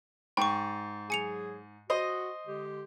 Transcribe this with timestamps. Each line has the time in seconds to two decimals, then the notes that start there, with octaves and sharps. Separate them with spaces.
0.37 G#2 G5 C#6
1.10 F#3 G#4 G#5 C#7 F7
1.90 F#4 C5 D#5
2.47 D3 G#3 G4